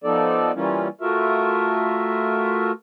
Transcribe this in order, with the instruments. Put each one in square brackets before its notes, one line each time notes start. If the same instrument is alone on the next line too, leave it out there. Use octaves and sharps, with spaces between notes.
[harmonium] F3 B3 D#4 A4 D5
E3 G3 A#3 C#4 E4 F4
A3 F4 F#4 A#4 E5